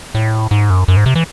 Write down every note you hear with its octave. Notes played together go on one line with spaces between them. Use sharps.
A2
G#2
F#2
F#2
G#2
C3
E3